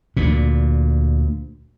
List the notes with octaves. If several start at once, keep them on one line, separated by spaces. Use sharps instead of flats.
D2 A#2